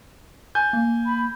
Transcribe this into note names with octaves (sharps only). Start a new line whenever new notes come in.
G#5 G6
A#3
B5